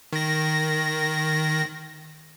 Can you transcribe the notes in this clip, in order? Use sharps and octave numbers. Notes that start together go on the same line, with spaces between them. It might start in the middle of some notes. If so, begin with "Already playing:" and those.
D#3 A#6